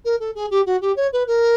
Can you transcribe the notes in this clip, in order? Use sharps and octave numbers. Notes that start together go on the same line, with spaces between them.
A#4
A4
G#4
G4
F#4
G4
C#5
B4
A#4